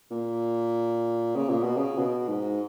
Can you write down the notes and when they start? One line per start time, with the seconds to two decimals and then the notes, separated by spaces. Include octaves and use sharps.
0.11 A#2
1.36 C#3
1.50 A#2
1.63 B2
1.77 C#3
1.98 B2
2.28 G#2